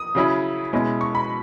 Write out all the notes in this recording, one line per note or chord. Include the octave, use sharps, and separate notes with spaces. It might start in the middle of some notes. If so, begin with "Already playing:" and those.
Already playing: D#6
C#3 F#3 C#4 E4
B2 G#3 C#4 E4
C#6
B5